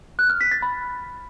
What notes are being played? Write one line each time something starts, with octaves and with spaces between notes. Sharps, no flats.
F#6
F6
B6
A6
B5